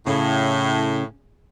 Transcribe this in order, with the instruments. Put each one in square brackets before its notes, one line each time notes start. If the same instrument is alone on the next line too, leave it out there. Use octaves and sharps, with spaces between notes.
[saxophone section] A2 [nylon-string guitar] C#3